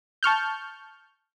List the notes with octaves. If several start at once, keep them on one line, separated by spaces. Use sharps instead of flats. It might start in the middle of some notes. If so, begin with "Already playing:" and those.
A5 C#6 F6 G6